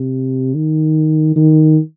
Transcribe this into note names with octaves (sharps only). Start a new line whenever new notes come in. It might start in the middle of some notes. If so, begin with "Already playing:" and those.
Already playing: C3
D#3
D#3